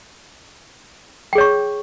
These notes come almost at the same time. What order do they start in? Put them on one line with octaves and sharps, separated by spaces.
G5 G#4 C#5 C#6